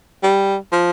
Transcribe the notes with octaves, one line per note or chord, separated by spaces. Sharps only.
G3
F3